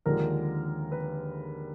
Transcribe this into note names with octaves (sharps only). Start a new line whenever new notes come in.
D#2 D3 F3 G#3 A#4
B4